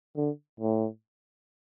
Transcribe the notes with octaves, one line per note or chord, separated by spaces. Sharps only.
D3
A2